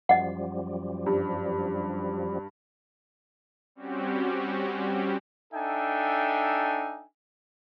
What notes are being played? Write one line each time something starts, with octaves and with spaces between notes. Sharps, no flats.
F#2 F3 G3 D#5 F#5
G2
G3 C4 C#4 F#4 G4
D4 D#4 A4 E5 G5 G#5